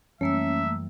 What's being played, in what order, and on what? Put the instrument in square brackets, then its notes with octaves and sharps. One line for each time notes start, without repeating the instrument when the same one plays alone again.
[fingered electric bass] F#2 E3 G3 [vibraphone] A3 A#3 E6 [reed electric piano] C#4 [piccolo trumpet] E5